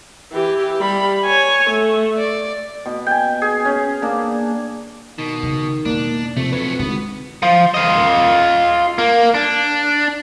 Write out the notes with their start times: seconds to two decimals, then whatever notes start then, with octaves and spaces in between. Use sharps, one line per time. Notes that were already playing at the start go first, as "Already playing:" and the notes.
0.33 E3 G4
0.80 G3 B5
1.25 C#5 G#5
1.70 A3
2.18 D5
2.86 B2
3.07 G5 G#5
3.42 G#4
3.65 C#4
4.02 A#3 D4
5.18 B2 D#3
5.43 C#3
5.86 E1 A#3 D4
6.37 F2 C3 A3
6.52 F#3 A3 B4
6.79 G#1 D3 B3
7.43 F3
7.74 F4 D#5
8.98 A#3
9.34 D4